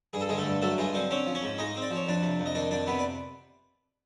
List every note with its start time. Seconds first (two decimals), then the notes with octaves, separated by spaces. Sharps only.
0.13 G2 G#4
0.21 A4
0.29 D3 G#3 G#4
0.38 A3 A4
0.45 G2
0.62 F#3 A3 A4
0.78 G2 G#3 G#4
0.94 D3 C4 C5
1.10 C4 C#4 C#5
1.26 F3
1.35 C#4 C#5
1.43 G#2
1.58 G#3 D#4 D#5
1.75 C4
1.82 D5
1.90 F3
1.96 C#5
2.07 F2 D4 D5
2.22 C3
2.40 F2
2.46 D#5
2.55 D#3 D4 D5
2.71 F2 D4 D5
2.87 C3 B3 B4
2.99 D5